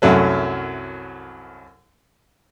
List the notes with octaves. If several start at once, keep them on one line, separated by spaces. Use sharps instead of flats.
C2 F#2 F#3 A3